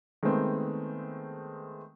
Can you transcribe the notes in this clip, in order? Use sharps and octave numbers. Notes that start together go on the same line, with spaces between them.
D#3 G#3 A3 B3 C4